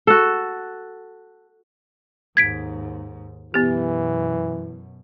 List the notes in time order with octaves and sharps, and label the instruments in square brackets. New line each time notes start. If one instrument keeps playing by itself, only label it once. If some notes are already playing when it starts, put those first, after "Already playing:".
[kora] F#4 A4
[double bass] D#2 G#2 [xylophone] G#6 B6 D7
[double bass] F#2 B2 [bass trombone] E3 [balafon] B3 G4